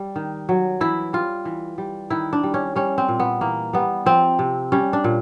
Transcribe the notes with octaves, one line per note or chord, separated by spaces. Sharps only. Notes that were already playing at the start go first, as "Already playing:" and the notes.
Already playing: G3
D#3
F#3
E3 E4
G3 F4
E3
G3
D#3 E4
D4
G3
C#4
G3 C#4
C4
A#2
B3
E3 A#3
G3 B3
F3 C4
C3
G3 C#4
D4
A#2